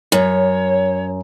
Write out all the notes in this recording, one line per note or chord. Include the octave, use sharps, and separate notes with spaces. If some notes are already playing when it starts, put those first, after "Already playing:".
F#2 C#5